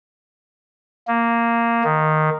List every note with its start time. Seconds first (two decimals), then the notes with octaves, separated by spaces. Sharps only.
1.08 A#3
1.84 D#3